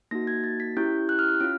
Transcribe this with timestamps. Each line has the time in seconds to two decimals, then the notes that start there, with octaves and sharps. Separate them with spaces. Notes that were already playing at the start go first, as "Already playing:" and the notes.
0.11 A#3 D#4 F#4 A#6
0.27 G#6
0.44 A6
0.60 B6
0.77 C#4 E4 G4 G6
1.09 F#6
1.19 F6
1.40 C#4 F4